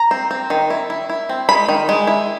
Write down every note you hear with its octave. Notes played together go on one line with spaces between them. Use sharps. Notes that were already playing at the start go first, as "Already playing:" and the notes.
Already playing: A#5
C4
C4
D#3
E4
E4
E4
C4
G#3 B5
D#3
G#3
E4